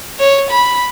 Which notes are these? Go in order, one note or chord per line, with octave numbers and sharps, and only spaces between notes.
C#5
B5